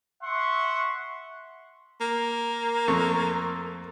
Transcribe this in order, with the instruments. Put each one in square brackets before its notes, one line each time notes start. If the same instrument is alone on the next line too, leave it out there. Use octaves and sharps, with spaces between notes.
[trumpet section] E5 F#5 C6 C#6
[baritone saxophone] A#3
[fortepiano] F2 A3 C#6